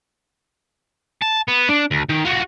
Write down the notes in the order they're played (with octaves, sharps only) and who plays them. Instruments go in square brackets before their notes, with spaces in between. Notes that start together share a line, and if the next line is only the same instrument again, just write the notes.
[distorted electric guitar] A5
B3
D4
D2
D#3
F4 F#4